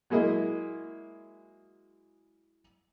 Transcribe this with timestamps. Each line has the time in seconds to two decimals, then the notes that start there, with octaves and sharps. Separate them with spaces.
0.10 F#3 G#3 A#3 E4 G#4 D#5